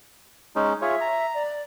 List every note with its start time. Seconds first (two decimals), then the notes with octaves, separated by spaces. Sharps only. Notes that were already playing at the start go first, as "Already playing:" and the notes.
0.56 G#3 C#4 D#4
0.82 F4 G#4 C#5 E5
1.01 A#5
1.34 D5